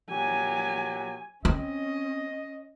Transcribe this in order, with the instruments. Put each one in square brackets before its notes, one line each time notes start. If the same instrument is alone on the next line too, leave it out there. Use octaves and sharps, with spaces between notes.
[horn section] A#2 F#3 G4 [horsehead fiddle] G#5
[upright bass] C4 [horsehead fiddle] C#4 [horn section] D#5